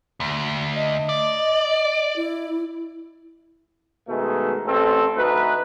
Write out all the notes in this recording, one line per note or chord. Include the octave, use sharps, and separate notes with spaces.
D2
D#5
D5
E4
B2 D#3 G#3 A3
A1 C4 A4
D2 D#4 B4